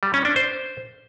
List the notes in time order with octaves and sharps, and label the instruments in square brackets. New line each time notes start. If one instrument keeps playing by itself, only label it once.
[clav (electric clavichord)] G3
C#4
D4
C5